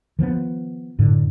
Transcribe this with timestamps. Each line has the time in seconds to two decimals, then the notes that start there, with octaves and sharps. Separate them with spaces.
0.19 D#3 F3 A3 B3
0.99 F#2 A2 D3